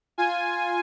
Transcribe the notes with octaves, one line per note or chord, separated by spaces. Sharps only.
F4 G#5